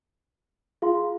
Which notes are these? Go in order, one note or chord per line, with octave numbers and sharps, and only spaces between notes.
F4 G#4 F5 C6